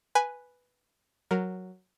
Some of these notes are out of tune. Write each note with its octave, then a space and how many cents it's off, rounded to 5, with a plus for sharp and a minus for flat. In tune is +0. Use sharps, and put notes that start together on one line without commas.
B4 +0 G#5 +0
F#3 +0 A#4 +0